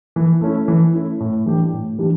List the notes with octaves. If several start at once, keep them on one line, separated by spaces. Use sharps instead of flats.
E3
A3 C#4 E4
E3
A3 C#4 E4
A2
E3 G3 D4 G4
A2
E3 G3 D4 G4